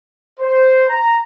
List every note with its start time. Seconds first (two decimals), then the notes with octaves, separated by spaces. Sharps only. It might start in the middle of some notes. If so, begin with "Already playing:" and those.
0.39 C5
0.89 A#5